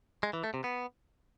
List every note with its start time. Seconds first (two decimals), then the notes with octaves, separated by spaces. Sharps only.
0.23 G#3
0.33 E3
0.44 A3
0.54 C3
0.64 B3